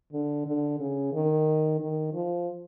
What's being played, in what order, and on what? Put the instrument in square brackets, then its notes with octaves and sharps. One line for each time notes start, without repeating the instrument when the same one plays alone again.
[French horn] D3
D3
C#3
D#3
D#3
F3